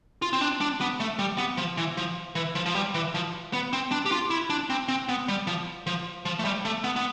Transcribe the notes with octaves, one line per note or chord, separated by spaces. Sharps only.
F4
C4
D4
D4
B3
A3
G3
B3
F3
E3
F3
E3
F3
F3
G3
E3
F3
B3
C4
D4
G4
F4
E4
D4
C4
C4
B3
G3
F3
F3
F3
A3
G3
A3
B3
B3